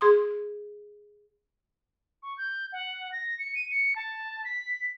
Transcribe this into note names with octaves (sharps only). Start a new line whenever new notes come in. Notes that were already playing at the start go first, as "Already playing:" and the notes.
G#4 C6 D#6
C#6
G6
F#5
A#6
C#7
D#7
C#7
A5
B6